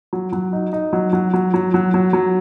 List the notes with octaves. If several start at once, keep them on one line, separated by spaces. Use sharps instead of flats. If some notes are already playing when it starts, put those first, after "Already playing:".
F#3
F#3
D#4
D#4
F#3
F#3
F#3
F#3
F#3
F#3
F#3